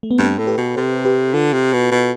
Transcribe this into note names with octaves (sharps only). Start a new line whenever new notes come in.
A3
B3
G2 A3 C4
A2 A4
G4 B4
B2
C3 A4 C5
G4 B4
D3 F4 A4
C3
B2
B2